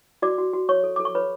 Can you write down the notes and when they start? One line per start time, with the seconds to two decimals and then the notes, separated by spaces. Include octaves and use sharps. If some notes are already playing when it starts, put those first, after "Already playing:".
0.22 F#4 D5 D6
0.38 F#4
0.54 F#4
0.69 C#5 C#6
0.84 A4
0.96 A4 D6
1.05 C#6
1.15 B4 C#5 B5